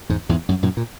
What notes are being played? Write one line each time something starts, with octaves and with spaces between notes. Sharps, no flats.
E2 G#2
E2 G#2
F#2
F#2 A#2
A#2